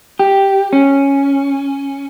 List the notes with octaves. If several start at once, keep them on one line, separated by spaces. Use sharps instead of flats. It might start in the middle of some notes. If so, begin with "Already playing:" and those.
G4
C#4